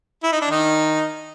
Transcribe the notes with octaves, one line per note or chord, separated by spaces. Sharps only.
E4
D#4
D4
D#3 D#4